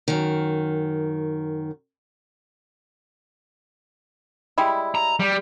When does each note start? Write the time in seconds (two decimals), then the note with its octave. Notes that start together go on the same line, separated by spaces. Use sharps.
0.08 F#2 D#3
4.58 G3 G#3 E4
4.95 A#5
5.20 G3